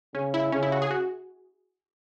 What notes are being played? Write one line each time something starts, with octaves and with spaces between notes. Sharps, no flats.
C#3 C#4
E4
C#3 C#4
E4
F#4
G#4
F#4